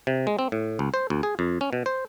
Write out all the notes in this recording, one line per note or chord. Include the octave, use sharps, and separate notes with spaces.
C3
G#3
C4
A2
C#2
C5
D2
G#4
F2
C#4
B2
C5